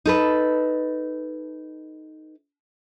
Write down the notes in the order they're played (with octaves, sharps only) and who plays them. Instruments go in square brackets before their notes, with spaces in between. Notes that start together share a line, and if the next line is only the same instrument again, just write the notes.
[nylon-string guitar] D#4 A4 B4